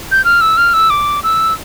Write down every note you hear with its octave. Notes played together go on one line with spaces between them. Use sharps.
G6
F6
E6
F6
E6
D6
E6